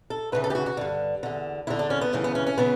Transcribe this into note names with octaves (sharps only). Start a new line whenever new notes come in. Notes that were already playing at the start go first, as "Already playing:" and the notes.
A4
D2 C#3 E3 B4
A4
G4
F#4
F#4
G2 D3
E2 D3
E2 D3 E4
D4
C#4
B3
D2 C#3 E3 A3
B3
C#4
C#4
C#3 E3 B3